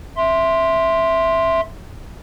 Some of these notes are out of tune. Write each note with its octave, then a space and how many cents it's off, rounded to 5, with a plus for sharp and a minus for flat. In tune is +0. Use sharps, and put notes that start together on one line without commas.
E5 +0 C6 +0